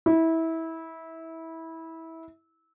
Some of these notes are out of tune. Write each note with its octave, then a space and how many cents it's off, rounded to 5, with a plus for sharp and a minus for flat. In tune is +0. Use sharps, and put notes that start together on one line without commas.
E4 -20